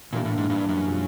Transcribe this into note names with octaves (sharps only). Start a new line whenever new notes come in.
A#2 E3 G3 A#3 D4 G4
A2
G#2
G2
F#2
B2 G#3 C4 F4